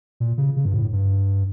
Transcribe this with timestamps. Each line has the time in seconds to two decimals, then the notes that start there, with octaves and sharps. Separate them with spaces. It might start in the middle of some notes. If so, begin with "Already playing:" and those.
0.20 A#2
0.38 C#3
0.57 C#3
0.65 G2
0.74 A2
0.93 G2